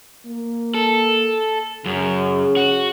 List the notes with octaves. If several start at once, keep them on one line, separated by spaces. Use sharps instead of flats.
A#3
A4
F#2 C#3
F#4